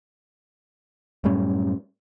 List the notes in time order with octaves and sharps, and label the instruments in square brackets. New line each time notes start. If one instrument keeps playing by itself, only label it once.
[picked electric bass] F#2 A2 G3 C#4